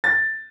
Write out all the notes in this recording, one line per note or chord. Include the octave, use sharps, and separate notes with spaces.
A6